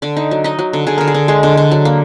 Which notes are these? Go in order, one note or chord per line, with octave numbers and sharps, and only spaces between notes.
D3 D5
D#4
F#3
D#4 D#5
F#3
D3
D3 G#4
D3 A#4
G#4
D3
G#3 G#4
D3
D3
F#3
A#3